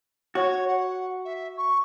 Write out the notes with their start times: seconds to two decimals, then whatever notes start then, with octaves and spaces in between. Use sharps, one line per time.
0.35 F#4 C#5
0.67 F#5
1.24 E5
1.57 C#6